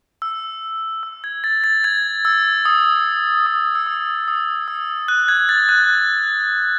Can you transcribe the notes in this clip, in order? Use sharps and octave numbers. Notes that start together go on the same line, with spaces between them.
E6
E6
G#6
A6
A6
G#6
E6
D#6
D#6
E6
D#6
D#6
E6
F#6
G#6
A6
F#6